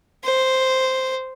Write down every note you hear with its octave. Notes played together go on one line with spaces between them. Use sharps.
C5